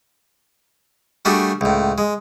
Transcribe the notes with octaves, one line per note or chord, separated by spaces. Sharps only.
G3 A3 D4 F#4 G#4
C#2 A2
G#3